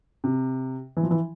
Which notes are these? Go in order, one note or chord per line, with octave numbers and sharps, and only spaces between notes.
C3
E3
F3
E3